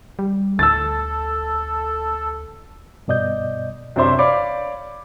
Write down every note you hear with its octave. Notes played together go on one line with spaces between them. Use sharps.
G3
D2 A4 E6 A6
G2 B2 D5 D#5 G6
F#2 C3 D4 C5 E5 C6
C#5 D5 F5 B5 D6